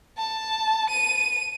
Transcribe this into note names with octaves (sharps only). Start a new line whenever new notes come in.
A5
D#7